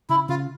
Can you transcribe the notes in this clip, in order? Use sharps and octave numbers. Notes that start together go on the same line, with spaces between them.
C#3 E4
C#3 F4